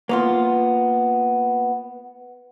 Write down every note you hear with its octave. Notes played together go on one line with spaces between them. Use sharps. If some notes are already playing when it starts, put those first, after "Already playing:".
A#3 B3 F4